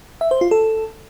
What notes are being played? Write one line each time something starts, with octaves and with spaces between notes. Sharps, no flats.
E5
C5
F4
A4